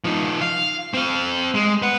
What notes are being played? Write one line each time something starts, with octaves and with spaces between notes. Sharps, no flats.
F3 D#4
F5
C4 F5
G#3
B4 F#5